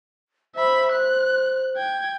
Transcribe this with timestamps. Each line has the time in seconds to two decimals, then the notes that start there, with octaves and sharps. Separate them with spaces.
0.56 C5 E5 B5
0.92 F#6
1.77 G5 G#6